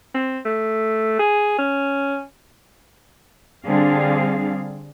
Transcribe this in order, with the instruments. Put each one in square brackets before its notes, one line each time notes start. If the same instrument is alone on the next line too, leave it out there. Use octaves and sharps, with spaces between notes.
[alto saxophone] C4
A3
G#4
C#4
[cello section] D3 G3 C4 D4 G#4 F5